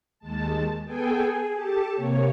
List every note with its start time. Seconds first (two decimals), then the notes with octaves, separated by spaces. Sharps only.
0.19 D#2 G#3 A5
0.85 B3 G#4 A4 G5 G#5
1.21 G#4
1.53 G4 A4 A5
1.94 C3 A#3 C#5